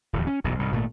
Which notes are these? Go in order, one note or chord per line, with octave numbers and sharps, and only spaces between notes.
D1 E2 F3
C#4
E1 B1 F#2 B2
C2 G#2
G#1 A#2 A3